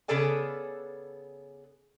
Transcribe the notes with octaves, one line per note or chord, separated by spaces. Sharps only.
C#3 B3 G#4 A4 D5 G#5